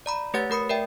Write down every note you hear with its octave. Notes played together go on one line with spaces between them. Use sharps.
D5 A#5 B5
A3 G4 B4 C#5 F#5 A6
A3 A#4 B5 D#6 C#7
A#4 D5 E5 G5